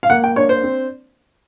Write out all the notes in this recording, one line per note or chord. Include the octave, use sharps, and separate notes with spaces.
F5
A#3 F#5
G5
D4 C#5
C5
C4